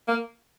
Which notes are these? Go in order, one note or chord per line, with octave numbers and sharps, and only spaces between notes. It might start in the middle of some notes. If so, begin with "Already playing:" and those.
A#3